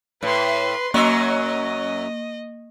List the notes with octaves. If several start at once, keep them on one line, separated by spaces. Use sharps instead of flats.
A2 B4 C6
F#2 F#3 A#3 D#5